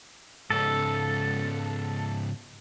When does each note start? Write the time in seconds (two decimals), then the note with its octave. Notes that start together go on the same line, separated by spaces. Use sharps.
0.50 G#2 C#3 A4